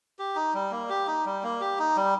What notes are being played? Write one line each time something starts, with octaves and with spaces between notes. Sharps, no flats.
G4
D#4
G3
A#3
G4
D#4
G3
A#3
G4
D#4
G3